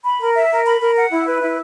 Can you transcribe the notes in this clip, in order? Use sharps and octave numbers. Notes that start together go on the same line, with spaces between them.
B5
A#4
E5
A#4
B5
A#4
F#5
E4
B4
E4